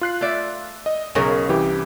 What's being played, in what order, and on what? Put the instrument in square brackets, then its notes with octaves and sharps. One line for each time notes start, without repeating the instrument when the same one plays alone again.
[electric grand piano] F4 F#6 C7
[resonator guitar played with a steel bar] A3 D5 E5
[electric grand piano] D#5
[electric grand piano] B1 G#4 [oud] C#3 A#4 [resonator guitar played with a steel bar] C#5
[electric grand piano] C2 E3 G4